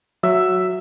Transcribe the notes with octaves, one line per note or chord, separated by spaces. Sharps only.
F#3 E5